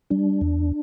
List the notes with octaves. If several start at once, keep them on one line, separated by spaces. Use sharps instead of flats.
G3 D4
E2